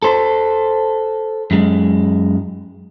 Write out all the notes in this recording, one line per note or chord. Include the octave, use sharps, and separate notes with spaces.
A4 C5
F#2 G#3